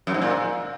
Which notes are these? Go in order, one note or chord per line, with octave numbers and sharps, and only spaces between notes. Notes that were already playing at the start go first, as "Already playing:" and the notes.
F#2
G#2
A#2